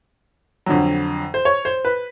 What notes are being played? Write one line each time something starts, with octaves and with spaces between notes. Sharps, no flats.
F2 D3 F#3
C5
C#5
C5
B4